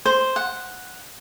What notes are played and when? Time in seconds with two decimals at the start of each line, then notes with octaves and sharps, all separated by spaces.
0.05 C5
0.36 F#5